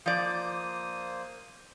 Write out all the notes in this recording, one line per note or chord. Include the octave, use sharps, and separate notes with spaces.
F3 A#3 C5 D5 D#6